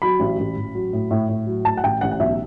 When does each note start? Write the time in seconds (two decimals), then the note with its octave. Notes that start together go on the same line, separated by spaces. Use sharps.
0.02 F#3 B5
0.20 A1
0.39 A1
0.57 A1
0.75 F#3
0.93 A2
1.11 A2
1.29 A2
1.47 F#3
1.65 A2 A5
1.77 F#5
1.83 A1 G5
2.01 A1 F#5
2.11 F#5
2.20 B1 E5